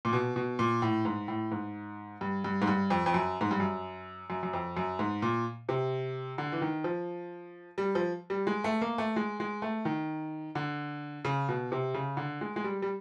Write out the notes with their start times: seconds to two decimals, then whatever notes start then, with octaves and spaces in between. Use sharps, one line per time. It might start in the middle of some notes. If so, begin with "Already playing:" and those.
0.05 A#2
0.13 B2
0.36 B2
0.59 A#2
0.82 A2
1.05 G#2
1.28 A2
1.52 G#2
2.21 G2
2.44 G2
2.62 G#2
2.68 G2
2.90 F2
3.06 F2
3.14 F#2
3.41 G#2
3.51 G2
3.60 F#2
4.30 F#2
4.43 F#2
4.53 F2
4.77 F#2
4.99 G#2
5.22 A#2
5.69 C3
6.38 D3
6.52 E3
6.62 D#3
6.84 F3
7.78 G3
7.95 F3
8.30 G3
8.47 G#3
8.64 A3
8.82 A#3
8.98 A3
9.16 G#3
9.40 G#3
9.62 A3
9.85 D#3
10.55 D3
11.25 C#3
11.49 B2
11.72 C3
11.94 C#3
12.17 D3
12.41 G#3
12.56 G#3
12.64 G3
12.82 G3